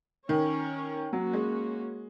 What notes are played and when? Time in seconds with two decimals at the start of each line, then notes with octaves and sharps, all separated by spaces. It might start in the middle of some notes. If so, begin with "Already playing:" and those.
0.29 D#3 C#4 A#4 C#5
1.12 F#3 A#3 C#4 F#4
1.33 G#3